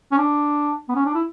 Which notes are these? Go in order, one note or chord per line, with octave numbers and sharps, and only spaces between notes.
C#4
D4
B3
C#4
D4
E4